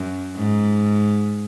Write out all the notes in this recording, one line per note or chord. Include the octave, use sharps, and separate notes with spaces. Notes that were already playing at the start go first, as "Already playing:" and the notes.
Already playing: F#2
G#2